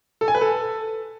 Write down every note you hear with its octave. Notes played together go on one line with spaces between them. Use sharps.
A4
G#5
B4
A4